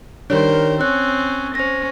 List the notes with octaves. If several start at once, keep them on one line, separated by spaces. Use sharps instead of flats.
D#3 G3 D4 A#4 C5 C#5
C4 C#4 C#5 F#6
C#4 C5 A#6